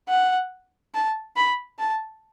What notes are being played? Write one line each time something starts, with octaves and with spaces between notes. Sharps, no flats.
F#5
A5
B5
A5